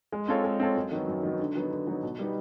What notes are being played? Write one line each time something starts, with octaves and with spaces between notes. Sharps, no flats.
G#3
C4 F4 A4 C#5
G#3
C4 F4 A4 C#5
F#2
D#3 F#3 B3
F#2
D#3 F#3 B3
D3
F#3 B3 D#4
D3
F#3 B3 D#4
B2
G3 B3 D#4